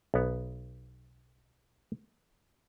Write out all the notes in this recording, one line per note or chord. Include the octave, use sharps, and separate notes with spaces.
B1 B3